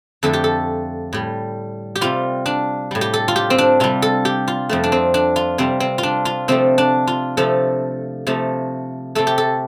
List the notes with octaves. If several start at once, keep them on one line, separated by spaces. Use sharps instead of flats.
F2 D3 A3 A4
G4
A4
A2 G3
G4
C3 G3 F4
D4
A2 G3
G4
A4
F4
G4
C4
D4
C3 G3 F4
A4
G4
F4
F2 F3 A3
D4
C4
D4
F4
C3 G3 C4
C4
F4
D4
F4
C3 F3 A3 C4
D4
F4
C3 F3 A3 A4
C3 F3 A3
C3 A3 A4
G4
A4